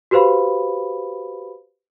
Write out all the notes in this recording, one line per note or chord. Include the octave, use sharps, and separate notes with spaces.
F#4 G4 B4 C5 F5 B5